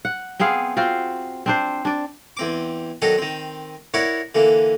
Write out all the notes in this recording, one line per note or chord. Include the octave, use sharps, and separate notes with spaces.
F#5
B3 C4 G#4 F5
C4 F4 F#4 C5
C4 D4 C5
D4 D5
E2 C4 D6
D#3 F#3 D4 A4 D#5
D#3 C4
E4 A#4 C#5 D5 F#5
D3 E3 A#3